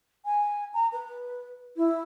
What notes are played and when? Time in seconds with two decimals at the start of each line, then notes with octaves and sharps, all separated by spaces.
0.25 G#5
0.74 A#5
0.92 B4
1.76 E4